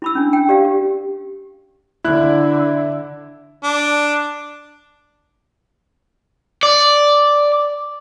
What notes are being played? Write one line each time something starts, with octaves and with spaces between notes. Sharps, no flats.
E4 B5 E6
C#4 D4
G5
G4 D5 F5
G4
D3 E4 F#6
D4
D5